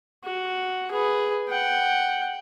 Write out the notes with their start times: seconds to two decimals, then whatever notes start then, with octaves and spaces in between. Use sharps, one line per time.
0.24 F#4
0.91 G#4 B4
1.49 F#5 G5